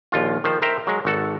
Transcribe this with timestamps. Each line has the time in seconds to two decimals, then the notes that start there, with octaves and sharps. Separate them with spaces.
0.12 A#1 D#2 F4
0.44 D#3 F3 C5
0.62 A#4 C5 E5 G5 A#5
0.87 F#3 G#3
1.05 G#1 F#4 A4